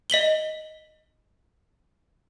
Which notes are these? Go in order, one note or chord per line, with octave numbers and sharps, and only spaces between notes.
D#5 B6 F#7 G7